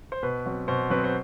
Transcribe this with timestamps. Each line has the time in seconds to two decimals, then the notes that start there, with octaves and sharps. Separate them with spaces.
0.12 C5
0.23 B2 B4
0.46 F#3 C4
0.68 B2 C5
0.90 F#3 C4 B4
1.04 C5